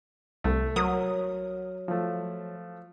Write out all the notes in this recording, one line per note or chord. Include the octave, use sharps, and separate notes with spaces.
C2 A3
F#3 A#4 D#6
F3 A3